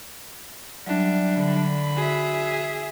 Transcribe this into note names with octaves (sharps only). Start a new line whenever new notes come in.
F#3 G3 D4 E5
D3 B5
F#4 G#4 E5